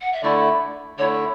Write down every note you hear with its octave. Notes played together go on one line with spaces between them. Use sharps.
F#5
E5
D3 A3 E4 D5
D3 A3 E4 C#5